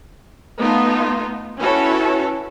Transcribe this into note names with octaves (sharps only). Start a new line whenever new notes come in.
A3 B3 D#4 F4 A4
C#4 E4 F#4 A4 B4 C#5